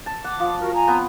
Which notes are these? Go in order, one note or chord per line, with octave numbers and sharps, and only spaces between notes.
A5
F#5 D6
F3
F#4 A#4
G#5 A#5
B3 C4